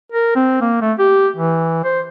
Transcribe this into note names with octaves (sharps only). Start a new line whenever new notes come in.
A#4
C4
A#3
A3
G4
E3
C5